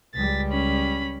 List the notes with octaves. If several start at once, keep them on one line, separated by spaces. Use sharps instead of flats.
C#2 G3 A6 B6
C#4 B5